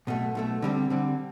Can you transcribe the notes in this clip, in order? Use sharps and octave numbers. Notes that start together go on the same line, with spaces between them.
B1 B2 A3
B1 B2 A3
D3 G3 C4
D3 G3 C4